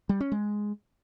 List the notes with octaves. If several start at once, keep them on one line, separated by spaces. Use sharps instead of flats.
G3
C#4
G#3